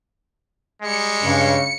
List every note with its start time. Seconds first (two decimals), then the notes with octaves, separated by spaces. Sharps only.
0.83 G3 G#3 C#7
1.23 G2 C#3